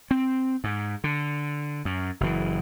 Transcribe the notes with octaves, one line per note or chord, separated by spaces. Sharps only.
C4
G#2
D3
F#2
F#1 E3